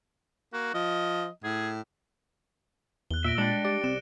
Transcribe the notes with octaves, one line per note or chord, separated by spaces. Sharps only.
A#3 F#4
F3 D#5
A2 G#4
E2 F#6 G7
A#2 E5 A#6 D7 G7
G3 G#3 D4 C#7
G4 D5 D7
C2 C4 E7